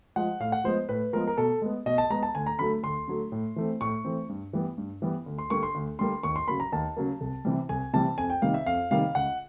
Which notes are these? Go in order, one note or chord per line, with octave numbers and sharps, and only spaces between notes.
F3 G#3 F#5
A2 F5
F#5
F3 G#3 B3 C5
A2 B4
F3 G#3 B3 A#4
A#4
B2 A4
G#3 B3
B2 D#5
A5
G#3 B3 A#5
A5
D2 G#5
A#5
D3 F#3 A3 B5
D2 C6
D3 F#3 A3
A2
E3 A3 C4
A2 C#6
E3 A3 C4
G2
E3 G3 B3
G2
E3 G3 B3
D2
C6
D3 G3 A#3 C#6
C6
D2
D3 G3 A#3 C6
D#2 C#6
C6
C#3 F#3 A#3 B5
A#5
D#2 A5
C#3 F#3 A#3
C2
C3 E3 G3
C2 G#5
C3 E3 G3 A5
F2 G#5
G5
C3 D#3 G3 A#3 F5
E5
F2 F5
C3 D#3 G3 A#3 F5
C#2 F#5